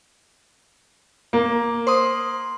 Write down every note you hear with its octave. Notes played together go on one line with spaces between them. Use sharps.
A#3
C5 C6 D#6